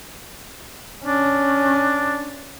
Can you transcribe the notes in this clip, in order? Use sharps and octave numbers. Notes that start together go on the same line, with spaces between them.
C#4 D4